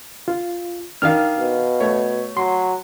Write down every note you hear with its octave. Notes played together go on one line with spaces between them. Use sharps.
F4
D#3 D4 F5 F6
B2
A3 C#5
F#3 C6